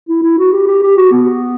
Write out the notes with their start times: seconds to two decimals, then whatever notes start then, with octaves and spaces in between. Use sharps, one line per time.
0.09 E4
0.23 E4
0.39 F#4
0.53 G4
0.68 G4
0.83 G4
0.97 F#4
1.11 B3